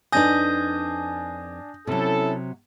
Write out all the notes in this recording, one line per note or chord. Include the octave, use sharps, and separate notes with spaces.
F2 D4 D#4 B4 G#5 D#6 G6 A#6
C3 F#3 C#4 E4 A4